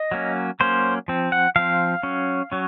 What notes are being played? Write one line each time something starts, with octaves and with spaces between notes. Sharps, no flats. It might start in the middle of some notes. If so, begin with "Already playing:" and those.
Already playing: D#5
F#3 A#3 C#4
F#3 A#3 C#4 C5
F3 C4
F#5
F3 C4 F5
F#3 C#4
F#3 C#4